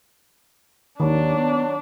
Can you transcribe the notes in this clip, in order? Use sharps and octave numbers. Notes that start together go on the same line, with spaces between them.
D#2 D#3 F#3 D4
B3